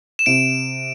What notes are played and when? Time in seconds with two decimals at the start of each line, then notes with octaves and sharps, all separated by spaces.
0.19 E7
0.26 C3 D7